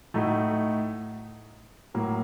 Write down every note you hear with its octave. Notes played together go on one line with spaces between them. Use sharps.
A2 A3 D#4 F#4
A2 F#3 A#3